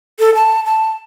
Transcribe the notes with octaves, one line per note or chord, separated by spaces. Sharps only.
A4
A5
A5